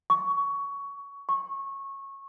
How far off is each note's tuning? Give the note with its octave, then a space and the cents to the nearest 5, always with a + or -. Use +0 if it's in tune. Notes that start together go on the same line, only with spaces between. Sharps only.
C#6 +15
C#6 -20